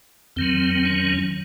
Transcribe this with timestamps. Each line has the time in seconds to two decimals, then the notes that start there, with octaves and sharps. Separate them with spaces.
0.36 F2 D#3 F#3 C4
0.75 C4
0.85 C#4